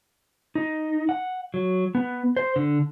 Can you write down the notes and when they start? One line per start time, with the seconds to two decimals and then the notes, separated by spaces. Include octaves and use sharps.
0.55 D#4
1.09 F#5
1.54 F#3
1.95 B3
2.36 C5
2.56 D3